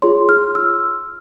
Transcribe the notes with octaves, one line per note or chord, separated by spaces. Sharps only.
F4 G#4 C#5 C6
F6
E6